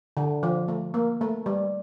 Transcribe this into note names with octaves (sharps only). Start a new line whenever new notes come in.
D3
F3
A3
A#3
A3
G3